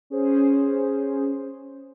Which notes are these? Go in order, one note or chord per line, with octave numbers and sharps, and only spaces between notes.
C#4 G#4 C5